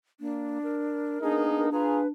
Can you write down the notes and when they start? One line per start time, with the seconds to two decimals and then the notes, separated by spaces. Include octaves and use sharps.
0.20 A#3 D4
0.63 A#4
1.22 A#3 B3 D4 D#4 G#4
1.72 F4 G#4 B4 A#5